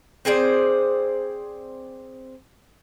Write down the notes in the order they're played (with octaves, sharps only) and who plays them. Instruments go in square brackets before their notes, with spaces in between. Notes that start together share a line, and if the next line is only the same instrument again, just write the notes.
[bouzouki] C4 G#4 C5 D5